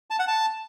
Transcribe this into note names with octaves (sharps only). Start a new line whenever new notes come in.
A5
F#5
A5